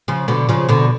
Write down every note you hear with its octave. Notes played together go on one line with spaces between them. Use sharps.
C#3 F3
B2 D3
C#3 F3
B2 D3